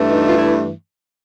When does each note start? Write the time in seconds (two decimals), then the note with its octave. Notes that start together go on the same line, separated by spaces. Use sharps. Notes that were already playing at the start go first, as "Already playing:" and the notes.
Already playing: G2 E3 A3
0.10 D#4
0.26 F4
0.37 E4